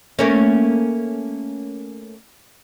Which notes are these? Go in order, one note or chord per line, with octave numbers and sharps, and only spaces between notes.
A3 A#3 C#4